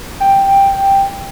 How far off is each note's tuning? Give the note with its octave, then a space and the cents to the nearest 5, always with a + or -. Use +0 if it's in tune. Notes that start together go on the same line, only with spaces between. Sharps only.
G5 +5